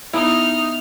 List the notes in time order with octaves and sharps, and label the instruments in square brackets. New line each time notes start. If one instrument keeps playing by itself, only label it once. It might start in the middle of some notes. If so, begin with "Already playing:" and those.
[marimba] B3 [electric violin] D#4 D#5 [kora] E4 [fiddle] F6